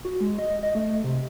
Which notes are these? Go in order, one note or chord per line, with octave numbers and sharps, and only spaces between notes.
F#4
G#3
D#5
D#5
A3
C3